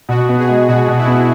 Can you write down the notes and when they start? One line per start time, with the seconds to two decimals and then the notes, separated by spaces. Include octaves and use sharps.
0.09 B2 F#4
0.29 B3
0.38 G#4
0.49 G#3
0.69 B2 F#4
0.88 B2
0.98 E4
1.08 B3